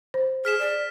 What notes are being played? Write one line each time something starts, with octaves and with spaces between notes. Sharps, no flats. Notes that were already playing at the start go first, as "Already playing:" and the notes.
C5
G#4 F6 B6 E7
D5